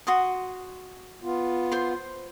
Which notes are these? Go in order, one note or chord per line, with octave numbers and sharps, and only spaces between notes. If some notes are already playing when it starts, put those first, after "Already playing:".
F#4 C6 D#6
B3 F4
C5 C6